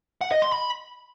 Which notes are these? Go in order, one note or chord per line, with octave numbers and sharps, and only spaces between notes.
F#5
D#5
C6
B5